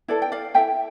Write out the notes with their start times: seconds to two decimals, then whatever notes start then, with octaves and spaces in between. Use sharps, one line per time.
0.08 E4 A4 B4 D5
0.22 G5
0.32 D5 F5
0.55 E4 A4 E5 G5